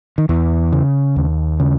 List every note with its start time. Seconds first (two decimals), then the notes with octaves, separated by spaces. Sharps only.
0.18 D#3
0.29 E2 E3
0.73 C#3
1.16 D#2
1.60 C#3